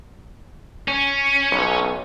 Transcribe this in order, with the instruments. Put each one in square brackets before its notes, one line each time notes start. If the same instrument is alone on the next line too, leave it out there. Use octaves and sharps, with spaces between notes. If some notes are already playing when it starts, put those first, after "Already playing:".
[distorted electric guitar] C#4
[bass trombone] B1